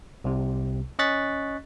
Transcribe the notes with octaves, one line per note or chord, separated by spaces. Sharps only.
C2 C3
C#4 D#5 C#6 F#6 A6 B6